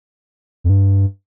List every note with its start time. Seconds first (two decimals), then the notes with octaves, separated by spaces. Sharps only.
0.64 F2
0.70 G2